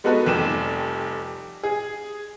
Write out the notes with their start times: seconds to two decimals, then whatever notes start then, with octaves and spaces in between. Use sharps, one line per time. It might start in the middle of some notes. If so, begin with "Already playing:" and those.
0.04 G#3 B3 D#4 F#4 A4 B4
0.26 F1 F2 G3 D6 E7
1.63 G#4